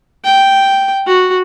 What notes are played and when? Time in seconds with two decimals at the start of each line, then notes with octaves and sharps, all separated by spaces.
0.24 G5
1.06 F#4